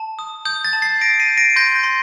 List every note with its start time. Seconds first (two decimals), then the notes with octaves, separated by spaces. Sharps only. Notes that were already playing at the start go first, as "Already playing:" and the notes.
Already playing: A5
0.19 D#6
0.45 D#6 G6
0.64 A6
0.73 A5
0.82 A6 C7
1.01 D#6 A#6 D7
1.20 C7 D#7
1.28 G6
1.37 A#6 D7
1.56 C6 G6 A#6
1.75 G6
1.83 C6